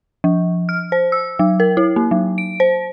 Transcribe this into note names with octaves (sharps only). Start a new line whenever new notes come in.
F3
F6
C5
E6
F#3
A#4
E4
A#3
F#3
D7
C5